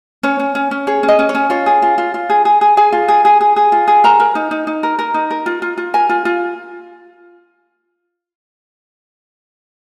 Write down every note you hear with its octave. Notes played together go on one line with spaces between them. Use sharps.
C#4 C#5
C#4
C#4
C#4
G#4 C#5
C#4
D#5
C#4
C#5
C#4
F4 C#5
G#4
F4
F4
F4
G#4
G#4
G#4
G#4 G#5
F4
G#4
G#4
G#4
G#4
F4
G#4
A#4 A#5
A#4
D#4
D#4
D#4
A#4
A#4
D#4
A#4
F4
F4
F4
A#4 G#5
F4
F4